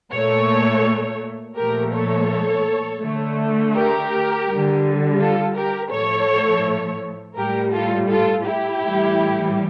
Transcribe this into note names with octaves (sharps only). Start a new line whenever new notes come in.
A#2 A3 A4 C#5
A#2 F3 A3 G4 A#4
A4 C#5
D3 A3
G4 A#4
G3
D3
F4 A4
G4 A#4
A2 F3 A3 A4 C#5
A2 G3 G4 A#4
F4 A4
F4 A4
E4 G4
A2 E3 G3